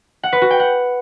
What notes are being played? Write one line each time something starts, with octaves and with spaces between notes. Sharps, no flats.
F#5
B4
F#4
G5
F#5